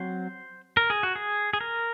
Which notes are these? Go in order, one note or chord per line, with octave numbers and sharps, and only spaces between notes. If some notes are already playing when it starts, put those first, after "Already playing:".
Already playing: F#3 C4 C5
A#4
G#4
F#4
G#4
G#4
A#4